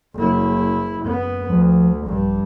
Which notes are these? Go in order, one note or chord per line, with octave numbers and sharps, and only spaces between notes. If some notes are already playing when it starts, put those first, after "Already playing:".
F#1 E4
F#2 B3
D2 F3
A#1 G2